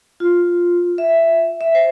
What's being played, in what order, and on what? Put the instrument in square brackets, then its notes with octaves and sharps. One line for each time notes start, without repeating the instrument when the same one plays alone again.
[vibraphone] F4
E5
E5
C5